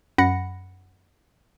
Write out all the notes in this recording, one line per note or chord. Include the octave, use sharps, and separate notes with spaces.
F#2 F#5 B5 A#6 C#7